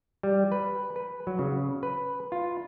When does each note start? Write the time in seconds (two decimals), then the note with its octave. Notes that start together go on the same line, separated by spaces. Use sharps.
0.23 G3
0.52 B4
0.96 B4
1.27 F#3
1.39 C#3
1.83 B4
2.32 F4